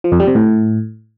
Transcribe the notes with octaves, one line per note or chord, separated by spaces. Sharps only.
F3
F2
G3
C3
A2